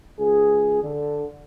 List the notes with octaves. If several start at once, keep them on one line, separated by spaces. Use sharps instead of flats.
C#2 G#4
D3